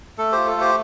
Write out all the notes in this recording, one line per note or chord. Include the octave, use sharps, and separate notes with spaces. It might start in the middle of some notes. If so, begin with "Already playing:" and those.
A3 A4
F4 G4 C5
A4
A3 G4 C5